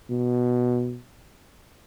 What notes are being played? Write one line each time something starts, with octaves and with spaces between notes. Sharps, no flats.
B2